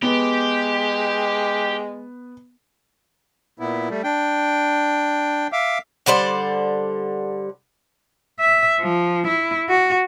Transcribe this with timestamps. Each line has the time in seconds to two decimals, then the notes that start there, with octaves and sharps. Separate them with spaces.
0.02 G#3 B3 G4
3.59 A#2 B3 E4
3.89 G3 A3
4.04 D4 G5
5.52 E5 F5 D6
6.06 D3 G3 C5 D5
8.40 E5
8.80 F3
9.27 E4
9.69 F#4